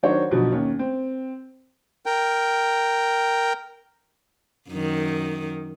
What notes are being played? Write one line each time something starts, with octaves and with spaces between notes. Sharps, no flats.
D#3 F#3 D4 F#4 C5 C#5
B1 B2 D3 F3 F#3
D#2 C#4
C4
A#4 G5
F#2 D#3